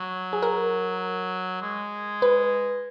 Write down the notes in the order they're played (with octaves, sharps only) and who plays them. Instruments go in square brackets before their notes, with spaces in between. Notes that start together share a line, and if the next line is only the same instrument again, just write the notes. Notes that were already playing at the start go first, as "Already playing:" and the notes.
Already playing: [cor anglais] F#3
[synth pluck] G#4
A#4
[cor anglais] G#3
[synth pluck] B4